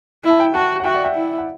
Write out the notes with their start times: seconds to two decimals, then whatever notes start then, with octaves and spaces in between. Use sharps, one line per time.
0.24 E4
0.30 A5
0.39 E5 G5
0.54 F#4 F#5 A5
0.80 F#5
0.84 F#4 E5 G5
0.94 D5 F#5
1.04 E5 G5
1.15 E4
1.38 F#5